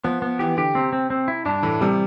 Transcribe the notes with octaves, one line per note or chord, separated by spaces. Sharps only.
F3 B3
B3
E3 G4
D3 G4
C3 C4
C4
C4
E4
G2 D4
A2 E3
C3 G3